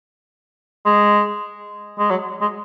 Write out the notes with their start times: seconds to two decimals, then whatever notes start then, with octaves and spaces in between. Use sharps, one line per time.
0.85 G#3
1.98 G#3
2.10 F#3
2.41 G#3